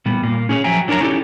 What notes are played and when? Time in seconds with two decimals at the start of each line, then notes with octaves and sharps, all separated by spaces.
0.05 A#2 G3 B3
0.23 A#2 A#3
0.49 C#4 G#4 A4 C#5
0.64 F3 F#3 E5 G5 G#5 A#5
0.88 F#3 D4 A#4 C#5 A#5
1.01 C#4 D#4 E4 G4 A4 D5